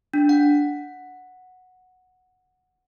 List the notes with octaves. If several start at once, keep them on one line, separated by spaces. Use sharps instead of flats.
D4
F#5